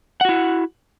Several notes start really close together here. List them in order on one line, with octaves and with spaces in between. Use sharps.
F#5 F#4 E4